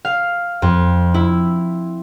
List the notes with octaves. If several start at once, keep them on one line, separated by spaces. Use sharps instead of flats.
F5
F2
E4